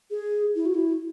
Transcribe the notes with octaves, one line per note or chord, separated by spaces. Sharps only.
G#4
E4
F#4
E4